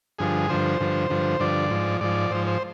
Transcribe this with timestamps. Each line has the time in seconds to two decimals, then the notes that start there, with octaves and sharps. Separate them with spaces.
0.19 G2 D3 F3 G#4
0.49 G2 D3 F3 C5
0.80 G2 D3 F3
1.10 G2 D3 F3
1.40 G2 D3 F3 D5
1.70 G#2 F3
2.01 G#2 F3 D5
2.31 G#2 F3 C5
2.47 C5